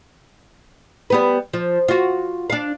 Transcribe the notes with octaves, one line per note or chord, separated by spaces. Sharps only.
G3 B3 B4
F3
F4 F#4
D4 F5